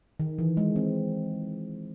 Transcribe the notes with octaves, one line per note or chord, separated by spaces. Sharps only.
D#3
E3
G#3
C4